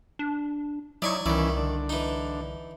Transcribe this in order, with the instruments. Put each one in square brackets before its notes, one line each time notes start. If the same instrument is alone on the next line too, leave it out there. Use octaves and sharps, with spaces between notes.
[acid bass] D4
[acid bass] F#3 [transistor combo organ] D#4 E4 [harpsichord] D5 G#5 C#6
[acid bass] C2 [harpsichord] D#3 D5 [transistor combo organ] E3 C#4 E4
[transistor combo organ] D3
[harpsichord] E3 D#4